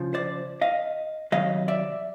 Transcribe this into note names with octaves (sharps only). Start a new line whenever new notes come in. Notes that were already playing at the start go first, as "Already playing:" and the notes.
Already playing: C#3 F3
C5 D5
D#5 F5
C3 D#3 F#3 D#5 F5
D5 E5